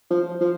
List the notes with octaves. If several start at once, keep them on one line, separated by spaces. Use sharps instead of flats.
F3
F3